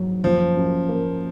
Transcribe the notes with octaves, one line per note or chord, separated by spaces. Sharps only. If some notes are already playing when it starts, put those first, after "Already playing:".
Already playing: G#2 F#3
F#1 F3
F#2
A#3